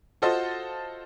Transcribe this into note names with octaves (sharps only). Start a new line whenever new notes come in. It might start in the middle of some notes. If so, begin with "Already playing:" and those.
F4 F#4 A4 C5 D#5